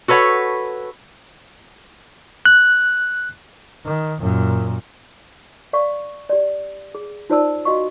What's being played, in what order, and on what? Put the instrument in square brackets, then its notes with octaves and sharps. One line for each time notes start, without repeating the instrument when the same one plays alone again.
[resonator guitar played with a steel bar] F#4 A4 B4 C#5 F#5
[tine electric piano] F#6
[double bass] D#3
F#2 A#2
[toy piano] D5 F5 C#6
G4 D5
G#4
D#4 F4 C5 D5 A5 E6
F#4 D#5 F5 C#6